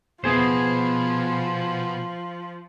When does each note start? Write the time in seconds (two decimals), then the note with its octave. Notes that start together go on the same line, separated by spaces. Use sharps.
0.24 B2 F3 B3 G#4 C5